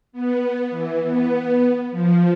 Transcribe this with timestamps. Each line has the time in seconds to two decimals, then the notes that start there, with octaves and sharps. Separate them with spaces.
0.12 B3
0.70 E3
1.03 B3
1.90 F3